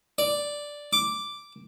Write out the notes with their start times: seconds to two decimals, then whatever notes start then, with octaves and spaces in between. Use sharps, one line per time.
0.18 D5
0.93 D6